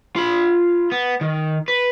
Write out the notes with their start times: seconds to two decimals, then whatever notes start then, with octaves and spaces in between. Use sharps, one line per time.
0.16 F4 B5
0.92 B3
1.21 D#3
1.68 B4